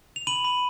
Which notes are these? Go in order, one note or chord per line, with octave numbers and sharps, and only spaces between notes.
F7
B5 D#7 F#7
B5